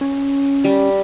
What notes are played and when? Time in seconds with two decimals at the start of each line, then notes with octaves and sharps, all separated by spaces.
0.01 C#4
0.64 G3